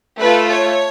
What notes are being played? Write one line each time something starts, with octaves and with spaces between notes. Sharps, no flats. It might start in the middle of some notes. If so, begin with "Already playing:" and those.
A3 F4 A4 B4
C#5